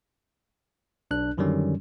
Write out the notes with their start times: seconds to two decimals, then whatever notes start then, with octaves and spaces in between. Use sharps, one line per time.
1.11 B1 D4 F#6
1.38 F#2 D3 D#3 F#3 G3 C#4